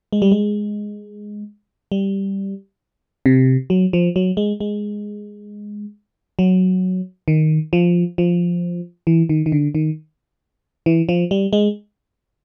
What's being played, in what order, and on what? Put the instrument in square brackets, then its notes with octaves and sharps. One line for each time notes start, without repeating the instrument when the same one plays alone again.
[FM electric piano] G#3
G3
G#3
G3
C3
F#3
F3
F#3
G#3
G#3
F#3
D#3
F3
F3
E3
D#3
D#3
D3
D#3
E3
F3
G3
G#3